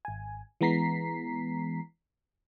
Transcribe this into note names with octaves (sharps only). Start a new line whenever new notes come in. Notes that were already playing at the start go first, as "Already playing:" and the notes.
G#1 G#5
E3 G#3 B3 A#5 B6 C7